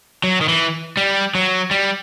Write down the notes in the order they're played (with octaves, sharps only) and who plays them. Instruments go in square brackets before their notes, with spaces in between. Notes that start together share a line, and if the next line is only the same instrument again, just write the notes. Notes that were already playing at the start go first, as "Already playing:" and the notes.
[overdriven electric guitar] F#3
D#3
E3
G3
F#3
G3